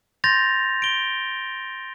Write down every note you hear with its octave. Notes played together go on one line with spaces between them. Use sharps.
C6 G6 A6 A#6 F7
D7 G7